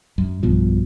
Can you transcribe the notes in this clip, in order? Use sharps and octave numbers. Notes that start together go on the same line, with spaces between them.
F#2
B1 G2 B2 F3